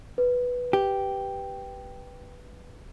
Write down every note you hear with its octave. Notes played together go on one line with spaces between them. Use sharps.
B4
G4